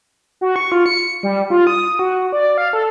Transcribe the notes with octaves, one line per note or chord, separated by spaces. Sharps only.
F#4
C#6
F4
C#7
G3
F4
D#6
F#4
D5
F5
A4